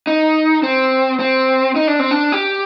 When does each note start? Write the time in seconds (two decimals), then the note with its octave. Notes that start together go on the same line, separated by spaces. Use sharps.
0.07 D#4
0.63 C4
1.20 C4
1.76 D#4
1.88 D4
1.99 C4
2.11 D4
2.32 G4